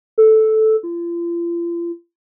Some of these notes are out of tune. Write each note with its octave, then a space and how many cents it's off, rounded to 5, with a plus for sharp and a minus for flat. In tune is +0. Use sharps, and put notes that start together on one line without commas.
A4 -5
F4 -40